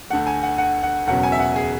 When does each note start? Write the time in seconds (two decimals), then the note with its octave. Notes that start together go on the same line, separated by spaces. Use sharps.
0.10 D2 D3 A3 F#5
0.27 G#5
0.43 F#5
0.58 F#5
0.83 F#5
1.07 E1 E2 C#3 F#3 B3 F#5
1.23 G#5
1.32 E5
1.39 F#5
1.56 G#4